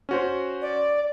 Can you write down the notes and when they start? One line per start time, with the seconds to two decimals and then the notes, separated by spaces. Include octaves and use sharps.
0.09 C#4 F#4 C5
0.62 D5